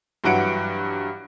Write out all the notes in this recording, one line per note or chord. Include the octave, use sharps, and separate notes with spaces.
G2 E3 F#3 F#5 D7